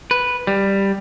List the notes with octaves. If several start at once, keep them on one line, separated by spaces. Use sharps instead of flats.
B4
G3